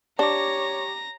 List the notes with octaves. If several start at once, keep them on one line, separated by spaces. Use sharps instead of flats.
D4 G4 C#5 A#5 D6 A#6